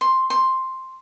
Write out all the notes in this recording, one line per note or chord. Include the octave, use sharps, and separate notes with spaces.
C6
C6